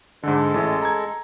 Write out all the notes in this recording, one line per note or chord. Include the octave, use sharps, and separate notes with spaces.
G#2 D3 G#3 A4
A1 E4
A#5 G#6